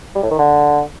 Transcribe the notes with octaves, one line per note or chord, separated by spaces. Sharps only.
G3
A2
D#3
D3